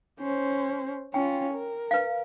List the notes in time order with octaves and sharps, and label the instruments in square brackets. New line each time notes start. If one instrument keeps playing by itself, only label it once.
[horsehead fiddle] C#4 C5
[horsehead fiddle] C#4 F4 [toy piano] G5
[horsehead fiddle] A#4
[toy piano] B4 F5